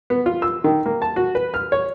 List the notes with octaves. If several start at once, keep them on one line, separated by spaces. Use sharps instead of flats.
B3
F4
E6
D#3
A#3
A5
F#4
B4
F6
C#5